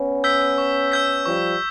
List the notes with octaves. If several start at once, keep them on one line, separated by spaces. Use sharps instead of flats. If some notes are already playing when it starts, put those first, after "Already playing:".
Already playing: B3 C#4
E6 G6 B6
C#6
E6 G6 B6
F3 G3 C#6